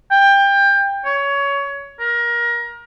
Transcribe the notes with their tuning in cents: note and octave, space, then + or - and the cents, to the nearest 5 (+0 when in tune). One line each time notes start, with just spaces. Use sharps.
G5 +20
C#5 +20
A#4 +25